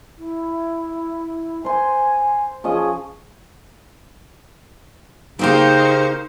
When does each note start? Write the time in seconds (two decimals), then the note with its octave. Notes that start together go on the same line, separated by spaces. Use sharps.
0.18 E4
1.65 C5 G#5 C6
2.64 F3 C#4 G#4 D#5
5.39 C#3 A#3 C4 D#4 G4 C5 F5 C#6